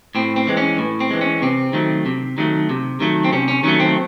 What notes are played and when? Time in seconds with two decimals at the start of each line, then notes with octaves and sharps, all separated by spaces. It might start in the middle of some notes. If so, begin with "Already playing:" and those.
0.15 A2 C4
0.36 C4
0.47 E3 G#3
0.57 C#4
0.78 A2
1.00 C4
1.10 E3 G#3
1.21 C#4
1.42 C3 C4
1.73 D#3 F#3 A3
2.06 C3
2.38 D#3 F#3 A3
2.69 C3
3.00 D#3 F#3 A3
3.24 C4
3.32 C3 C#4
3.48 C#4
3.63 D#3 F#3 A3 C#4
3.80 C4